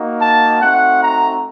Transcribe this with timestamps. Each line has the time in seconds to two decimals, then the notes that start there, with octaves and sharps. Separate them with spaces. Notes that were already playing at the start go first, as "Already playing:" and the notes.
Already playing: A#3 D#4 F#4
0.21 A5
0.61 A3 C4 D#4 F#4 F#5
1.01 A#5